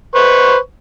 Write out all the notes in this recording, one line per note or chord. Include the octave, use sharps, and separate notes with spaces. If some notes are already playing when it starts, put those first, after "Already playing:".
B4 C5 C#6